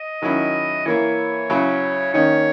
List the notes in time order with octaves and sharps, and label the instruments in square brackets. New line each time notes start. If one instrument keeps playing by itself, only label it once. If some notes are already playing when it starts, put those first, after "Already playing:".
Already playing: [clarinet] D#5
[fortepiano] D#3 F#3 C#4 E4
[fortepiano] E3 A#3 E4 [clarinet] C#5
[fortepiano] C#3 F#3 C#4 E4
[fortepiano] D#3 A#3 C#4 [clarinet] C#5